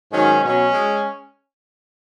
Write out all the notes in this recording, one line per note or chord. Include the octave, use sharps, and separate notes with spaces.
G#2 D#3 F#3 C#4
B2 F#3 C#4
G#3